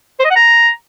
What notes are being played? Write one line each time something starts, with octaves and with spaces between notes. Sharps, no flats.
C5
D#5
F#5
A#5